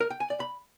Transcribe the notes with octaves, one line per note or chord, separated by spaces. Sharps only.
A#4
G5
G#5
D5
B5